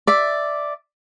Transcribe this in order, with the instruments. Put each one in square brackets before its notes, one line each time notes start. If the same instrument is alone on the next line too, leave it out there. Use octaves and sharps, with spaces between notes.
[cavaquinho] D5 E5